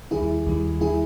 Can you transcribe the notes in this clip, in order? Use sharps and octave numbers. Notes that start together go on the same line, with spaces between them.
D#2 D#3 G3 E4 G#4
D#2 D#3 G3
D#3 G3 E4 G#4